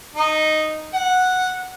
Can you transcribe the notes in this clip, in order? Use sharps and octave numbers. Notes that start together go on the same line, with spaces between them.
D#4
F#5